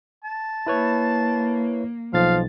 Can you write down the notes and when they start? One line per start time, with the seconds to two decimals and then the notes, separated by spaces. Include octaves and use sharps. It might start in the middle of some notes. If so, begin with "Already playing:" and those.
0.24 A5
0.67 A#3 E4 B4 C#5
2.14 B1 F3 F5 A6